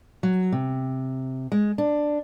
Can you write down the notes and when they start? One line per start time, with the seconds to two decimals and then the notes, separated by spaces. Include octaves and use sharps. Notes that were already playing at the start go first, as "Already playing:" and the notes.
0.23 F#3
0.52 C3
1.52 G#3
1.78 D4